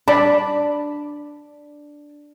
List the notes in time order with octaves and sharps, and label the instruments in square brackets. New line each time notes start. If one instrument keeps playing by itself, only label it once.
[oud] D4 [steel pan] D5 A5 B5